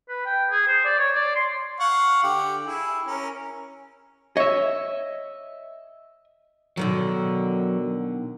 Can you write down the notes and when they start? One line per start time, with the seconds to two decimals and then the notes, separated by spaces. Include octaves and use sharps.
0.09 B4
0.26 G5
0.51 G#4
0.68 C5
0.85 D5
0.99 C#5
1.15 D5
1.35 C6
1.80 F5 F#5 C#6
2.23 D3 G4
2.65 E4 G#4
3.06 C#4 A#4
4.37 C#5 D#5 E5
6.77 B2 D3 D#3 F#3